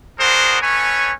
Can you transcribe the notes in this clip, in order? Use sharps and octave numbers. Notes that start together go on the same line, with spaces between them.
B3 D4 F#4 G#4 A#4 C5
A3 C#4 B4 C#5 G#5